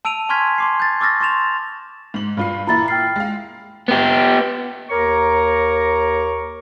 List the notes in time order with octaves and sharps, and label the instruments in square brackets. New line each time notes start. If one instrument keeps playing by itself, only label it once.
[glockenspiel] A5 E6 D7 D#7 F7
G#5 C6 C#6 F6 G#6 B6
C6 D6 C7
G6 A6
C#6 D6 E6 F6 A6 A#6
C6 C#6 A6 E7 F7
[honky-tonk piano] G#2 F#7
G2 F4 C7
[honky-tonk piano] A#2 E3 E4 [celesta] A#5 B5 A6
[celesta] G5 F6 C7
[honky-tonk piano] G#3 F5
[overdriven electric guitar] B3 G4
[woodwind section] D#2 A#4 C#5 A#5 C#6 D6